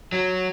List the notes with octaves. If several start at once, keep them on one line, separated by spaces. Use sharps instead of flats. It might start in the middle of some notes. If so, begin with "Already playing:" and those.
F#3